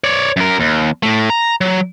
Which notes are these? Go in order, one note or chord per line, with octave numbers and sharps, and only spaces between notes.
C#5 D5
F#2 A#4
D#2
A2 A3
A#5
F#3